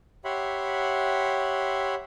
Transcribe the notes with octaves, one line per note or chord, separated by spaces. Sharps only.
G4 C#5 E5 F#5 B5 C6